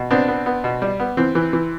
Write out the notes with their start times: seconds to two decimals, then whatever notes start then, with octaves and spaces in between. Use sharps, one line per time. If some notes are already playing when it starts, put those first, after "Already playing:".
Already playing: B2
0.10 B3 C4 D4
0.28 B3
0.46 B3
0.64 B2
0.82 G3
1.00 B3
1.17 E3 C4
1.35 E3
1.53 E3